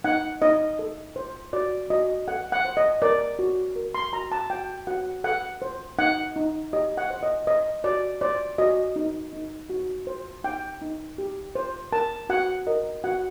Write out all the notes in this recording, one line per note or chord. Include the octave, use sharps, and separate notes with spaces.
D#4 F#5
D#4 D#5
A4
C5
F#4 D5
F#4 D#5
A4 F#5
F#5
C5
D#5
A#4 D5
F#4
A#4
C6
F#4 A#5
A5
F#4 G5
F#4 F#5
A4 F#5
C5
D#4 F#5
D#4
G4 D#5
F#5
C5
D#5
C5 D#5
F#4 D5
C5 D5
F#4 D#5
D#4
D#4
F#4
C5
D#4 G5
D#4
G4
C5
A#4 A5
F#4 F#5
A#4 D#5
F#4 F#5